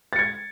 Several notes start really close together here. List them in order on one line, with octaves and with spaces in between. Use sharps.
A6 C#7 G#6